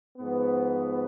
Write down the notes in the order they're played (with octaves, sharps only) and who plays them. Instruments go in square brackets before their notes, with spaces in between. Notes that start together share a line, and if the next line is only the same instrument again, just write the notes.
[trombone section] G#2 F3 B3